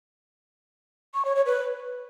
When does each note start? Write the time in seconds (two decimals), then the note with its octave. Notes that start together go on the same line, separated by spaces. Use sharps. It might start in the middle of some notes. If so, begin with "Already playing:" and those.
1.14 C#6
1.25 C#5
1.35 C#5
1.46 B4